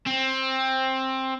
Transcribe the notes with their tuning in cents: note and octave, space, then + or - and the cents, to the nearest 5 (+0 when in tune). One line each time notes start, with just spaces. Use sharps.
C4 +15